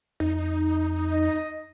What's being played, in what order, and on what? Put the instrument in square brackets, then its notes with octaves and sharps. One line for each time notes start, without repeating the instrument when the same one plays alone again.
[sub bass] F2 [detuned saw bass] D#4
[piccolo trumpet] D#5